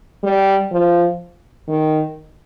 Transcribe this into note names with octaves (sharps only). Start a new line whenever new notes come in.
G3
F3
D#3